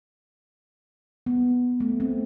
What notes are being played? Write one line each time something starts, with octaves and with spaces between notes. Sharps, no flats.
B3
A3
C4